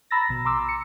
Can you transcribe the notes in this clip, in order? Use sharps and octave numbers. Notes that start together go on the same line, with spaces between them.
A#5 B5 E6 A6 A#6
A#1 B2
A#5 C6 D6 E6
C#7